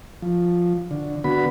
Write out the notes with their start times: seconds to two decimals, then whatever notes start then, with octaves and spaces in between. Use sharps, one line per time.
0.22 F3
0.91 D3
1.24 D3 B3 F#4 B5